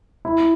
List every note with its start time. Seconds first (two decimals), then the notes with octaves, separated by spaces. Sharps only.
0.25 E4